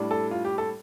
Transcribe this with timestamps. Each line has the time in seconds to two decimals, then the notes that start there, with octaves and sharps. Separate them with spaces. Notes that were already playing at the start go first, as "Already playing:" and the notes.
Already playing: A2 G3 D4
0.11 A4
0.31 F4
0.45 G4
0.58 A4